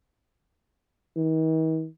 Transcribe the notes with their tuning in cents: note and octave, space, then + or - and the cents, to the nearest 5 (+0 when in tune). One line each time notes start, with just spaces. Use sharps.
D#3 +45